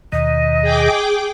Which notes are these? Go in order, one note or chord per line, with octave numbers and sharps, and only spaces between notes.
D#2 B2 D#3 D#5
G#4 G5 D6